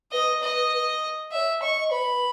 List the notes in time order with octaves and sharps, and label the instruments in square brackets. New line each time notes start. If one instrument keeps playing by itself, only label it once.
[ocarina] B4 [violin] D#5
[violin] D#5
[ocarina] D#5 [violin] E5
[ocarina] C#5
[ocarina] D#5 [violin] C#6
[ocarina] D#5
[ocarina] B4 [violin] B5